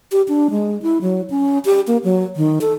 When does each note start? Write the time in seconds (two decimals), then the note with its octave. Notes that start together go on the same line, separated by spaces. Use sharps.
0.12 G4
0.28 D4
0.51 G#3
0.82 E4
1.02 F#3
1.30 C#4
1.65 G4
1.87 A#3
2.04 F#3
2.36 D#3
2.61 A4